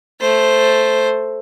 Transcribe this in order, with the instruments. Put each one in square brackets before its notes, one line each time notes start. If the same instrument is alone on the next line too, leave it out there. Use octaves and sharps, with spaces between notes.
[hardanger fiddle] A3 C5